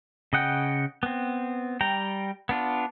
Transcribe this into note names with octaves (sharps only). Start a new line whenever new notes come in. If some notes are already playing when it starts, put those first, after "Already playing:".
C#3 D#5 F#5 G5
B3 C4
G3 G5 A#5
B3 D4 F4